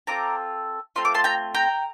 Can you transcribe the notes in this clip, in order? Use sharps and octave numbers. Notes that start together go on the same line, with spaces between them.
C4 F4 A4 A#5 D6
A3 C4 F4 C6
D6
A5 C6
G5 A#5
G5 A#5